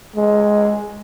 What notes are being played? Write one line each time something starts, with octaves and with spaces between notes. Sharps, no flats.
G#3